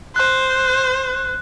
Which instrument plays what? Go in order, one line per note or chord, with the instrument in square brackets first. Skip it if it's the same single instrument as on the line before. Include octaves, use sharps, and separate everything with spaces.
[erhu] C5 [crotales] F#6